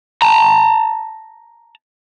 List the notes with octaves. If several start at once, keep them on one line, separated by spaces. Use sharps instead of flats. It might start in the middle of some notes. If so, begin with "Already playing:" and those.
A5 A#5